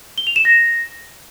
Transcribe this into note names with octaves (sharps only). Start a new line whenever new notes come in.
G7
F7
E7
A#6